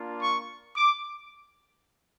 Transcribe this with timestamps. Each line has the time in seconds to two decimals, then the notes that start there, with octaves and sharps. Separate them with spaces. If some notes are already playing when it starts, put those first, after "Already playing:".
Already playing: A#3 D4 F4
0.22 C#6
0.75 D6